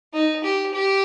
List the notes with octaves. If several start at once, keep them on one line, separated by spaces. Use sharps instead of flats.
D#4
G4
G4